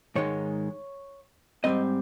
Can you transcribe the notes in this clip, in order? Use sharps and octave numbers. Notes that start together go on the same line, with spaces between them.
G#2 D#3 G#3 D#4 C#5
G#2 G3 C4 D#5